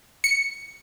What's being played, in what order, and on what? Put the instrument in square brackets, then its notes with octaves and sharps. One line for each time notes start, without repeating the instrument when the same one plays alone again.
[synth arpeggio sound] C#7